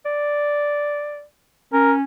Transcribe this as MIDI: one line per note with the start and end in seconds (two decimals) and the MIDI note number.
0.06 1.23 74
1.73 2.03 61
1.73 1.92 70